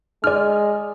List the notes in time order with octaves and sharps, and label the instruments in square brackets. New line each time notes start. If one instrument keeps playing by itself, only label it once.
[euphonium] G#3 [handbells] D5 F6